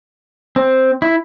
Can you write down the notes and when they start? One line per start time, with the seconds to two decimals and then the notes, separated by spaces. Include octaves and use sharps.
0.56 C4
1.02 E4